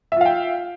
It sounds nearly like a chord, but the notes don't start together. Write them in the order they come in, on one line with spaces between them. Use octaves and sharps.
E5 F4 F5 G5